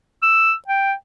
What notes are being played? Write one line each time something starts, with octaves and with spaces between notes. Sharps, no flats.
E6
G5